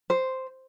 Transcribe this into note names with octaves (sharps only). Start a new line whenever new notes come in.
C5